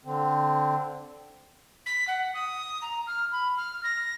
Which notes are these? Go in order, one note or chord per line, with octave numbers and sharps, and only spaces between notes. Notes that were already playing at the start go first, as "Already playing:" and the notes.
D3 C4
B6
F#5
D#6
A#5
F6
B5
F6
A#6